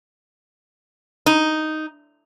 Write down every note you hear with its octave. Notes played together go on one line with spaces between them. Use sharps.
D#4